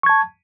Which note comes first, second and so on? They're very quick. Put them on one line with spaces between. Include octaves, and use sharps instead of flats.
C#6 G#6 A5